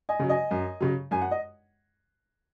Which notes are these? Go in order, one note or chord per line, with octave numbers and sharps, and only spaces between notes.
D#5 G#5
C#3 F#3
D#5 G#5
F#2
C#3 F#3
F#2 G#5
F#5
D#5